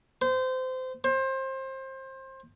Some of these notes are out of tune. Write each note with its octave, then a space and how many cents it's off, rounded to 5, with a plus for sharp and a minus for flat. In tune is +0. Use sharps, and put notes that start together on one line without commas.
C5 -25
C5 +25